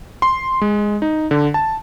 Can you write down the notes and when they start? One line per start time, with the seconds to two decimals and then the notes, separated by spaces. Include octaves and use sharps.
0.22 C6
0.61 G#3
1.02 D#4
1.31 D3
1.54 A5